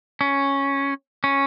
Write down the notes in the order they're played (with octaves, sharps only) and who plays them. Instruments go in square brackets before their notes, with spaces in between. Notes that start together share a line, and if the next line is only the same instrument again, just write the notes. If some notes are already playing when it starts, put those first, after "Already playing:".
[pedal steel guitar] C#4
C#4